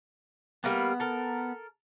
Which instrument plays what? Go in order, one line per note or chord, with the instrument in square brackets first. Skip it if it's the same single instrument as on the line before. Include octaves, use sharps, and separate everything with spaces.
[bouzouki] G3 A#3 B4 [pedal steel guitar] B3
[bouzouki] A4 A#4